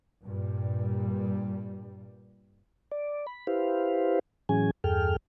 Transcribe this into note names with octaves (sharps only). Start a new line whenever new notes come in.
G2 A#2 G3
D5
B5
E4 G4 B4 C5 F5
A2 E3 F#3 C#4 G#4 G#5
E2 G2 G#4 A4 G5 F6